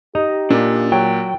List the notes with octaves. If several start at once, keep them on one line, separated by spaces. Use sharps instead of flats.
D#4 G4 D#5 A#5
A#2 D4
F#3 G5